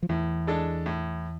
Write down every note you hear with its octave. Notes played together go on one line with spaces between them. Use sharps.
F3
E2 A2 E3
G#3 D4 A4
A2